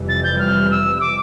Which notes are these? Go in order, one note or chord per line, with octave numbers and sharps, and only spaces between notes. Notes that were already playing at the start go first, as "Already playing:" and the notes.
Already playing: F1 F2 E3 G3
A6
G6
F6
E6
E6
D6